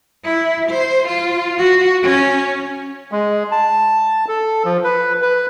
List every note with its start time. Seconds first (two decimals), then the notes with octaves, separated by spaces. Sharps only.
0.24 E4
0.70 C5
1.08 F4
1.58 F#4
2.03 C#4
3.12 G#3
3.51 A5
4.28 A4
4.65 F3
4.84 B4
5.22 B4